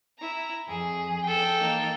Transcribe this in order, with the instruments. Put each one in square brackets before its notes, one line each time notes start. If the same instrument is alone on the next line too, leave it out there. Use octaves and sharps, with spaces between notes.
[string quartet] E4 A#5
F2 G#4
[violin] A4 G5
[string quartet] E3 A#3 D#4